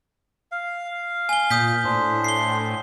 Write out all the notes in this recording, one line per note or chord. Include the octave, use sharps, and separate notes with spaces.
F5
G#5 G7
A#2 D#6 G6 B6
A2 D4 C5
C7 G7